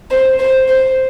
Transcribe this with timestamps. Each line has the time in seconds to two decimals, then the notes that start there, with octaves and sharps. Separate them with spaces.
0.10 C5
0.39 C5
0.68 C5